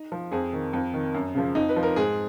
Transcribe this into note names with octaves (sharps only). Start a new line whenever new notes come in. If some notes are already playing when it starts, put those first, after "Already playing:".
Already playing: D#4
F3
F2 G#4
D#3
F2
D#3
F#2
C#3 F3
F2 D#4
B4
F3
A#4
G#2 G#4